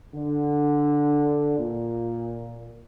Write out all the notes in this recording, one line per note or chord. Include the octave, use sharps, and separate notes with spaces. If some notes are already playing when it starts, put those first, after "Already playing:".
D3
A#2